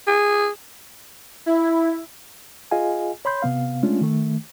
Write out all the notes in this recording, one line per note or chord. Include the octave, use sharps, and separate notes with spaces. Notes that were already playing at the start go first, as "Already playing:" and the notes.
G#4
E4
F4 G#4 D#5 F5 G#5
C#5 B5 C6 G6
C3 B3 F5
G#3 A3 C#4 D4 F4
D#3 A3